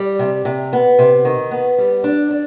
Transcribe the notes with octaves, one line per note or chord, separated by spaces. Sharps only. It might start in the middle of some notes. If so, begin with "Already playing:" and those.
Already playing: G3
C3
C3
B3
C3
D#3
B3
G3
D4
D4